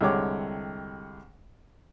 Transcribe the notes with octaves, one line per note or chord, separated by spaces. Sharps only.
C2 D3 G#3 G4 C#5 D6